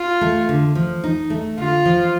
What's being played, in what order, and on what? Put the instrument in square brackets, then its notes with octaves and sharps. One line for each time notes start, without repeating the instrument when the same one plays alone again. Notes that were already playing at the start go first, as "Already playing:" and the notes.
Already playing: [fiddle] F4
[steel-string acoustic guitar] A3
D3
F3
D#4
A3
[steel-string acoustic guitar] D3 [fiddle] F4
[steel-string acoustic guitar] F3